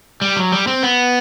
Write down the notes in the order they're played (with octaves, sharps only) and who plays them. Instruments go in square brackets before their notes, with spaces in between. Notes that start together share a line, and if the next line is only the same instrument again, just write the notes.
[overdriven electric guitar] G3
F#3
G3
C4
B3